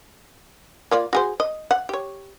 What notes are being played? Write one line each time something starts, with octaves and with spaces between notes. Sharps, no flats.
A#3 F4 D5
F#4 G#4 C5
D#5
F#5
G4 C#5